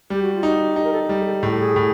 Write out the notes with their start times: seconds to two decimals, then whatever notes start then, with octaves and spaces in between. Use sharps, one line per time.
0.10 G3 G4
0.22 F#4
0.34 F4
0.43 D#4 F#4
0.76 D#4 G4
0.84 A#4
0.93 A4
1.09 G3
1.20 G#4
1.26 A4
1.43 A2 G#4
1.51 A4
1.59 G#4
1.76 A2